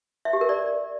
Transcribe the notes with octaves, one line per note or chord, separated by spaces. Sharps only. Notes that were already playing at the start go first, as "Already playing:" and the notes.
E5
G4
A#4
D5